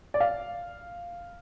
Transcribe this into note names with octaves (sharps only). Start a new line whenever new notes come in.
D5
F5